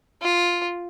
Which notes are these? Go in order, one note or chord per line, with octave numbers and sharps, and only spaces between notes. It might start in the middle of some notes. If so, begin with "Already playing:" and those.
F4